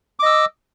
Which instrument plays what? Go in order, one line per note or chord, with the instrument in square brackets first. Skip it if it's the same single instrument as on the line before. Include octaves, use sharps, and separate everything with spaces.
[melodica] D6
D#5
E6